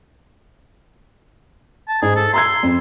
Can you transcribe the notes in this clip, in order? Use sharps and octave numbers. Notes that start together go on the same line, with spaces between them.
A5
G#2 G#4
A4
A#5 C6 E6 G#6
F2